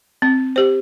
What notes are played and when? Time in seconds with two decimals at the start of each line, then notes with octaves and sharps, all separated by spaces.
0.22 C4
0.56 G4 C5